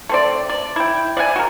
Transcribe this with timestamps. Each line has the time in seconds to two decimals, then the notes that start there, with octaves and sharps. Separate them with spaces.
0.09 A3 C4 D5
0.50 D5
0.76 E4 G5
1.17 D5 E5 F#5 G#5
1.36 F#4 A#4